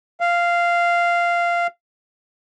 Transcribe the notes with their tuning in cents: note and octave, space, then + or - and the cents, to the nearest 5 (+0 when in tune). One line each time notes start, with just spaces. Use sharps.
F5 -10